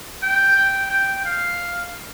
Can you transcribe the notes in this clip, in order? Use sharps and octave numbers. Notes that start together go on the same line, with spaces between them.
G5
G5
G5
F5